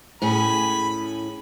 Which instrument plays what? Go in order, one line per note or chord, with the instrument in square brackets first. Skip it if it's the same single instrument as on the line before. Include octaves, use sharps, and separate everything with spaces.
[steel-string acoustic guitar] A2 C#4 G#4 [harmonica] B5